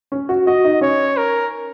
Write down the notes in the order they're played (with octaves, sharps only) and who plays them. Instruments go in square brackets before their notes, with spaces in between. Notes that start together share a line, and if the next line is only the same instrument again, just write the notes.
[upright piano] C#4
F#4
[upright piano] F#4 [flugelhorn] D#5
[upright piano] D#4
[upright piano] C#4 [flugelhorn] C#5
[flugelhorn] A#4